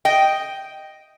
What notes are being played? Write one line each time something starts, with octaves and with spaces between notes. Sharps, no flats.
D#5 G5